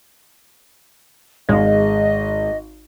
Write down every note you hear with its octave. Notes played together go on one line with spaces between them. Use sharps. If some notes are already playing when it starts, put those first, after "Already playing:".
G#1 G#3 D#5 F5